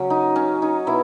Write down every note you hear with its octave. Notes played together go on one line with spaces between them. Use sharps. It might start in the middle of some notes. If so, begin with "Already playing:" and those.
Already playing: C#3 F#3 C#4
D#4
C#4
D#4
B2 E4